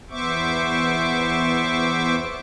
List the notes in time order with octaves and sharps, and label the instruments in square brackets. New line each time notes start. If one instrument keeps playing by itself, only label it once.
[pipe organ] E2 B3 C5 E5 C#6 D6